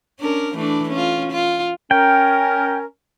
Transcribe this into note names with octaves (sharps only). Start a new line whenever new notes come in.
C#4 D4 A#4
E3 A3 D4
C#4 F4
F4
C#4 A#4 G5